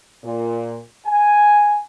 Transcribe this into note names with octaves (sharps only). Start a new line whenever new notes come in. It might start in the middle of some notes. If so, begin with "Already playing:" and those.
A#2
G#5